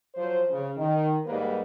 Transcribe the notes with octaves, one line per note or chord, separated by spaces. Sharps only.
F3 F#3 C5
C#3
D#3
G#2 G3 A#3 B4